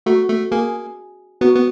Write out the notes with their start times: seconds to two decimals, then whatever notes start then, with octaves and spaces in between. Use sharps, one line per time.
0.06 A3 F#4
0.28 A3
0.51 A#3 G#4
1.41 B3 F#4
1.56 B3